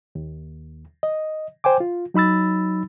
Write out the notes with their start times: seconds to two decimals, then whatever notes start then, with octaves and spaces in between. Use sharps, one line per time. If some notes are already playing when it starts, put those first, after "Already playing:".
0.15 D#2
1.03 D#5
1.64 C5 G5 G#5 D6
1.80 F4
2.14 F#3 D#4 B5 E6 A6